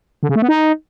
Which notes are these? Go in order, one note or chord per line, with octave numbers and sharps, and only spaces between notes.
D3
C#3
A3
B3
D#4